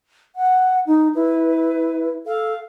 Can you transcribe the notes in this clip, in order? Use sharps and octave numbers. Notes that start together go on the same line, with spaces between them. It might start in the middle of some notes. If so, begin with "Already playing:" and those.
F#5
D#4
E4 B4
A4 F5